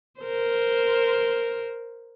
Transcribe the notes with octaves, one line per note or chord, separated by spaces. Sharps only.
A#4 C5